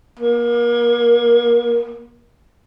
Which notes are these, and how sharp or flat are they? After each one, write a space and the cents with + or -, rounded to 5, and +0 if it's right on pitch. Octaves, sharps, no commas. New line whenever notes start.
A#3 +30